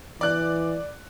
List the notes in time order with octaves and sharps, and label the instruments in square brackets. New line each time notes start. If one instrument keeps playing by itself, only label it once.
[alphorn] E3 [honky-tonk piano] D5 F#6